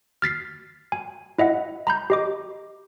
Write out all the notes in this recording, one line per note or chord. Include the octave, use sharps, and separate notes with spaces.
F6 A6 B6 C7
G#5
E4 D#5 E5 F#5
A#5 B5 G6
G4 D#5 D6